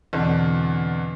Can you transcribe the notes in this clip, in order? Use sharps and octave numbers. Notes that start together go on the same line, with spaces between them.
E2 B2 D3 C4 D4